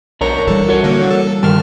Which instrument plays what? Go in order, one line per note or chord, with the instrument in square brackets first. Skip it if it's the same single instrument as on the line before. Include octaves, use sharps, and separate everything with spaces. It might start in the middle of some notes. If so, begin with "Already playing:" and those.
[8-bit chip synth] B1 A#5 [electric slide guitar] D4 A#4 C#5
[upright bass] E3 G3 [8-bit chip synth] A4
[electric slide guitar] F#4 A#4 C#5
[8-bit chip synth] D3 A#3
A4
[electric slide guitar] G2 D#3 A#4 [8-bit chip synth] A5 F6